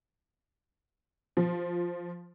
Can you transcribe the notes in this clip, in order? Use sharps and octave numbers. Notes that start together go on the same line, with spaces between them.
F3